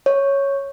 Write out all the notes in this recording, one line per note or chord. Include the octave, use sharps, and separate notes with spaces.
C#5